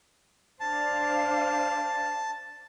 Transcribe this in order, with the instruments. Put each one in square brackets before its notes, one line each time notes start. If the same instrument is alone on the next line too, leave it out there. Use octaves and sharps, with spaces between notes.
[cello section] D4 C5 F5 [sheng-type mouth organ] A5